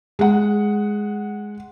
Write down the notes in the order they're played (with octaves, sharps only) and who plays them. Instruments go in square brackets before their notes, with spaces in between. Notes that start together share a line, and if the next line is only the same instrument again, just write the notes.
[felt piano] G#3 F#5